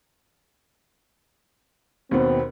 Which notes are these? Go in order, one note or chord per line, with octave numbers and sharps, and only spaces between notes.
D#2 B2 B3 C4